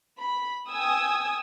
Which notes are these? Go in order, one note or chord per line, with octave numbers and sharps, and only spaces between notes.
B5
G5 G#5 D#6 E6 G#6